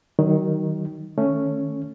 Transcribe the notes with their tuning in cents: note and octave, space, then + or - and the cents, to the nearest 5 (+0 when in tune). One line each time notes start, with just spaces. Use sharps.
D#3 +5 F#3 +40
D#3 -25 A3 +10 C#4 +0